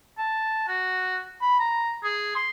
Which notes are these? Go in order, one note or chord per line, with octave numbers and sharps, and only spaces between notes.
A5
F#4
B5
A#5
G#4
C6